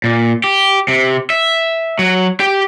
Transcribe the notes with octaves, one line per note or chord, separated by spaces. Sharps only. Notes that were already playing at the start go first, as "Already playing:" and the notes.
A#2
G4
C3
E5
F#3
G4